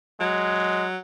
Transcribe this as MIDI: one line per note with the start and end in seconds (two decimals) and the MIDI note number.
0.21 0.97 54
0.21 0.85 56